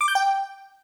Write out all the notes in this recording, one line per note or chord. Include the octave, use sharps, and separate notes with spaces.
D6
G6
G5